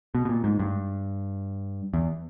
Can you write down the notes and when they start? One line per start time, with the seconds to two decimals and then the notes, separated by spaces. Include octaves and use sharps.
0.15 B2
0.25 B2
0.29 A#2
0.44 G#2
0.59 G2
1.94 E2